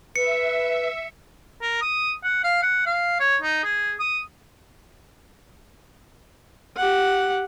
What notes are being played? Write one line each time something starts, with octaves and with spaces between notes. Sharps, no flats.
B4 E5 C#7
A#4
D#6
F#5
F5
F#5
F5
C#5
D#4
G#4
D#6
G4 F#5